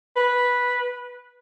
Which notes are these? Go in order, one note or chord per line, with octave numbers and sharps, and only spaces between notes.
B4